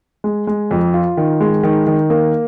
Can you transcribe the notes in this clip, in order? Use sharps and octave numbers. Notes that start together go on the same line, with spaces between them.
G#3
G#3
F2
F4
D#3
G#3
D#3
D#3
A#3